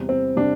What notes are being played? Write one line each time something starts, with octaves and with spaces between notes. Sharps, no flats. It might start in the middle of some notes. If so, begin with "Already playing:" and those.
Already playing: E2 C3 G3
C4
C3 G3 D4